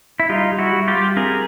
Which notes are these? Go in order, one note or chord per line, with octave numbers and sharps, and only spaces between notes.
E4
G3 D#4 F4
G3
E4 F#4
G3
F4 G4
G3
C4 G#4 A#4